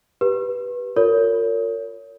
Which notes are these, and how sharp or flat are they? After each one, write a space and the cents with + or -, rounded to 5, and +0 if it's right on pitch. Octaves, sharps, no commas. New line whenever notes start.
G4 +0 B4 -10
F4 +35 A#4 -25 C#5 +25